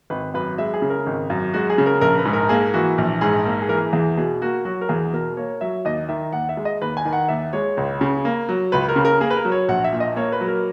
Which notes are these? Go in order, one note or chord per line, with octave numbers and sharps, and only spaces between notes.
G#1 B4
F#2 B4
G#3 E5
G#4
C#3
A#4
G#1
F#2
G#3 F#4
G#4
C#3
A#4
A#1 A#4
B4
G#2
A#4
A#3 G#4
E3 F#4
A#1
G#2 G#4
A#3
G#4
E3 A#4
G#4
E2 G#4
B2 G#4
A#3 F#4
F#3 F#4
A#4
E2 G#4
B2 A#4
A#3 C#5
F#3 E5
D#2 D#5
D#3 E5
D#2 F#5
E5
G#3
D#5
D#2 B4
G#5
D#3
F#5
D#2 E5
G#3 C#5
C#2
C#3
A#3
F#3
C#2 B4
A#4
C#3
A#4
A#3 G#4
B4
A#4
F#3
C#5
A#1 F#5
E5
A#2
D#5
A#3 C#5
B4
F#3
A#4